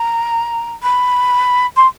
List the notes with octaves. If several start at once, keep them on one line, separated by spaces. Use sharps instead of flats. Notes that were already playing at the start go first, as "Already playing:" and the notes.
Already playing: A#5
B5
C6